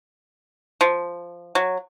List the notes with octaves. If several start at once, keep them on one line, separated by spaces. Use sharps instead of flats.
F3
F#3